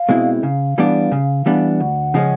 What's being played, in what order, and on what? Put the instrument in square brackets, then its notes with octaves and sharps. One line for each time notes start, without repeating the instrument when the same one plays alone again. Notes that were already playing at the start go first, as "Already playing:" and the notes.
Already playing: [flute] F5
[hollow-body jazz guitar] B2 G#3 C4 E4
[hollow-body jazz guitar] C#3 [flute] F5
[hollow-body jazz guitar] E3 G3 B3 D4
C#3
E3 G3 B3 D4
[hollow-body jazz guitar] D2 [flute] F#5
[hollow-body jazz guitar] C#3 F3 G#3 C#4